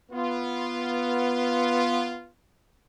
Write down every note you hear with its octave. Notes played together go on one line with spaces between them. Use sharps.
B3 F4